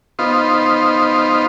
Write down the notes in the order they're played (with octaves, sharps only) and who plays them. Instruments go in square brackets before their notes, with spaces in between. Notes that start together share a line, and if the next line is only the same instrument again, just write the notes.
[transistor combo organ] B3 D#4 F4 C5